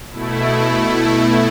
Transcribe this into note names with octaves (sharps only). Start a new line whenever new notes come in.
B2 A3 E4